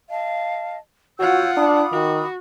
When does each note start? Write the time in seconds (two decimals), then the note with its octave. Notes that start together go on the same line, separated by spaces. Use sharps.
0.10 D#5 F5 A5
1.20 F4 F#4 C#5 F#5 E6 G6
1.57 D4 B5 D6 D#6
1.92 D#3 F#4